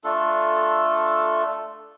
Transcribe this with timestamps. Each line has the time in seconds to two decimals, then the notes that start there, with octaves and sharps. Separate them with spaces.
0.04 A3 D4 F4 A4